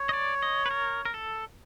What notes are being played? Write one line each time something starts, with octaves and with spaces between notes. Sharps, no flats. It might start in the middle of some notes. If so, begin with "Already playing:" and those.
Already playing: C#5
D#5
D5
D#5
B4
A#4
A#4
A4